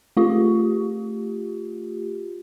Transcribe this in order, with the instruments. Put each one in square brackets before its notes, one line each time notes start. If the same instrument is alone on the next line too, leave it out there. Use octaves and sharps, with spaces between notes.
[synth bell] A3 F4 G4